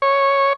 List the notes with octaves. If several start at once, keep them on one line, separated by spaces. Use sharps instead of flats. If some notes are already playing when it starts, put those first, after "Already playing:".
C#5